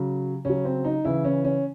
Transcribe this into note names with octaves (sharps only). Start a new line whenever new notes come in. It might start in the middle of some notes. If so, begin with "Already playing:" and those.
Already playing: C#3 F#3
C#3 F#3 C#4
C4
D#4
C#3 E3 E4
C#4
C#4